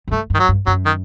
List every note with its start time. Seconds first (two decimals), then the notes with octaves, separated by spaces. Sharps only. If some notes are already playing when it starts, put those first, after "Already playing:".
0.08 F#2
0.11 G2 A3
0.30 G2
0.34 D#3
0.39 F#3
0.49 G2
0.67 F#2 F#3
0.86 D#3